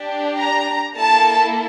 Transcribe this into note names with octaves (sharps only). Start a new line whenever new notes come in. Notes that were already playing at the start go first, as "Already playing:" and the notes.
Already playing: D4 G4
A#5
A#3 E4 A4 A5